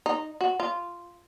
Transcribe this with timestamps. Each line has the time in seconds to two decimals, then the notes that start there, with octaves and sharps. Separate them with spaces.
0.06 D#4
0.41 F#4
0.60 F4